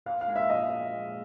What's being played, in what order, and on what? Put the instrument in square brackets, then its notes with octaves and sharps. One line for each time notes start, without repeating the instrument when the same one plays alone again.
[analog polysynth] A#2 [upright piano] F5
[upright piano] F5
[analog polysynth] G#3
[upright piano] E5
[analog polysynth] F3 [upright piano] D#5